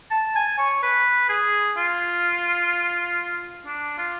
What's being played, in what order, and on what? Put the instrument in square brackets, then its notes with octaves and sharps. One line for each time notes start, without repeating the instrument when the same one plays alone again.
[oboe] A5
G#5
C#5
B4
G#4
F4
D4
F4